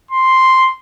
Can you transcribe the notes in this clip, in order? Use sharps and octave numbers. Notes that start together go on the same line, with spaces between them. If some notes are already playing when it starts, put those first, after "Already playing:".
C6